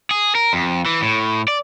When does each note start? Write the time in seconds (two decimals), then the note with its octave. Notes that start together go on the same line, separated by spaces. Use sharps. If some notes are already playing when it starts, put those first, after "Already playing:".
0.11 G#4
0.35 A#4
0.53 F2
0.86 E3
1.02 A2
1.48 D5